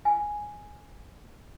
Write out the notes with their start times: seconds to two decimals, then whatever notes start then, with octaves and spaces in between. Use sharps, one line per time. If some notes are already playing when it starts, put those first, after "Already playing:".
0.05 G#5